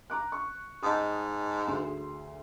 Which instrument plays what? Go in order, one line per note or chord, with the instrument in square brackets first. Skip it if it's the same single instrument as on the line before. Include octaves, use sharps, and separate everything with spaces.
[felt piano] A#5 D6 F#6
C#6
[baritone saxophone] G#2 [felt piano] D#5 A5 D#6
[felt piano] D2 G#4 C6